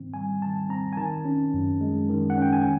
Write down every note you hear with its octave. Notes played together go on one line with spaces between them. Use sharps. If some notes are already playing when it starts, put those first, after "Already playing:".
Already playing: G#2 D#3 C4
G3 G#5
D#3 A5
C4 A#5
G#5
D#3 A5
C#4
F#2
G#3
D#3
F#5
C#4 G5
G#5